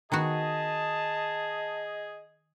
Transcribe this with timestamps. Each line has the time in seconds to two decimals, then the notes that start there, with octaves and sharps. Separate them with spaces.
0.12 D#3 B3 F#4 G#4 D#5 A5